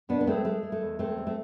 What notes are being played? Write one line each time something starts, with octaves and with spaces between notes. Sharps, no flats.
B2 B3 D4
B3
G#3 A3 C4
G#3 A3
G#3
A3
E2
G#3 A3 C4
G#3
A3